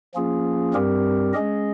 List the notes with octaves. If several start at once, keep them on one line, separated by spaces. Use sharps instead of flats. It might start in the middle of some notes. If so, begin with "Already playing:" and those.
F3 A#3 C#4 F4 G#4
G2 G3 C4 G4 A#4
G#3 C#4 G#4 D#5